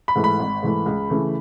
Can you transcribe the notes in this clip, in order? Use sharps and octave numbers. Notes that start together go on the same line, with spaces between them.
B5
G#2 E3 A3
B5
G#1
G#2 E3 A3
C#2
C#3 E3 A3